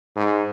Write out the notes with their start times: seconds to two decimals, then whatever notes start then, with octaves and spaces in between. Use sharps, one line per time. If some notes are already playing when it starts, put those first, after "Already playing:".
0.16 G#2